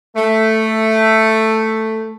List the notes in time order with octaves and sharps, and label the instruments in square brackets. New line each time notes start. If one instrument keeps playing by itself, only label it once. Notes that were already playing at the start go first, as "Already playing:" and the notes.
[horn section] A3